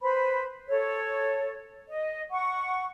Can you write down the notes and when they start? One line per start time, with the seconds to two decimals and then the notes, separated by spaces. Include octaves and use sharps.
0.01 B4 C5 B5
0.68 A4 C#5
1.90 D#5
2.31 F#5 C#6